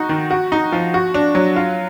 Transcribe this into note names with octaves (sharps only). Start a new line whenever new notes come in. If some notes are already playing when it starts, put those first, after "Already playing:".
Already playing: D#4 F#4
D#3
F#4
D#4
F3
F#4
D4
F#3
F4